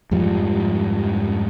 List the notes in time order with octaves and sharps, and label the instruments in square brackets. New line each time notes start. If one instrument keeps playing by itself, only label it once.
[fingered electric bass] F2 G#2 F3 G3